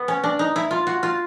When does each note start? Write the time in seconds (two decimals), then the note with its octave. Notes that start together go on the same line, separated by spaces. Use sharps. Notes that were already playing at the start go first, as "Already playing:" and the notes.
Already playing: B3
0.08 C#4
0.23 D4
0.39 D#4
0.56 E4
0.71 F4
0.87 F#4
1.03 F4